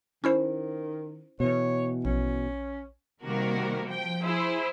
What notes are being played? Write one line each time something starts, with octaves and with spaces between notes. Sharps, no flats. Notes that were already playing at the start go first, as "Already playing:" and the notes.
D#3 C#4 E4 C5
B2 E3 C#5
A#1 C#4
C3 D#3 G3 A#3 F#4 A#4
F3 G5
E4 G#4 C5